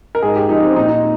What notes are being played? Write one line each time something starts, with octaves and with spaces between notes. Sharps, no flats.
A#4
G#2 G#4
G4
F3 D#4
C4
A#2 D#4
D#4